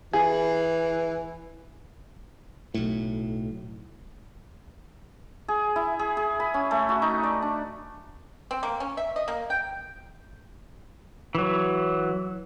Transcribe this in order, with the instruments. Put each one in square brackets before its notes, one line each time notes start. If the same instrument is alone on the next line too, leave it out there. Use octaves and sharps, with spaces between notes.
[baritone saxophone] E3 [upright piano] G#4
[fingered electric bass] B1 A2
[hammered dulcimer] G#4
E4
G#4
G#4
B5
C#4
A3
F#4
D#4
D5
D4
[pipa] C4
A#3
C#4
E5
D#5
A#3
G5
[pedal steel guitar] E3 F#3